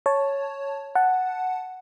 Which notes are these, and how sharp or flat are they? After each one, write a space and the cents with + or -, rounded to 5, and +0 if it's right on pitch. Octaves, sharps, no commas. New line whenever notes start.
C#5 +0 A5 +0
F#5 +0 A5 +0